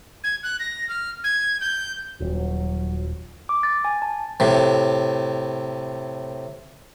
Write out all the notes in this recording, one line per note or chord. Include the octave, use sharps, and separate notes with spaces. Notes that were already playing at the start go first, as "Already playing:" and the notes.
G#6
F#6
A#6
F6
G#6
G6
D#1 F#3
D6
A6
G#5
A5
A2 C3